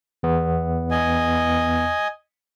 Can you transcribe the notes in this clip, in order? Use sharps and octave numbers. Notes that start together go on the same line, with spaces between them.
E2 B3
D#5 G#5